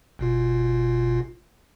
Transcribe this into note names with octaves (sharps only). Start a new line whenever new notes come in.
G1 B2 F4